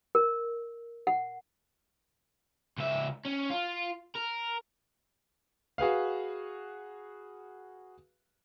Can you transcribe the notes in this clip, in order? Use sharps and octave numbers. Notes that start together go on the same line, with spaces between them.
A#4
F#5
C#2 E5
C#4
F4
A#4
F#4 G#4 B4 F5